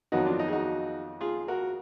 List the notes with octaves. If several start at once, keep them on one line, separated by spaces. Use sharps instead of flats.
F2 D#3 F#3 B3 D#4 F#4
D4 F4
D#4
G#4
D#4 F#4
F4 G#4
F#4 A#4